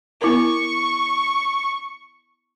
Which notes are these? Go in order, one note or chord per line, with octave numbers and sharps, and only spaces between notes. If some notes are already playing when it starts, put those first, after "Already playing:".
B3 E4 A#4 C#6